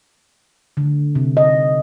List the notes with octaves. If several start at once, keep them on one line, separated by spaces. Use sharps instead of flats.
D3
C3
D#5